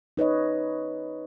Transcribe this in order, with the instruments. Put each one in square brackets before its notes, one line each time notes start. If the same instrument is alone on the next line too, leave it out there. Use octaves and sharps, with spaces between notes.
[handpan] D#4 B4 C#5 D#5